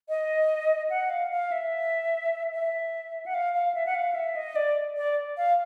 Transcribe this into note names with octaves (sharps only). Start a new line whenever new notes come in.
D#5
F#5
F5
F5
E5
E5
F#5
F5
F5
E5
F#5
F5
E5
D#5
D5
D5
F5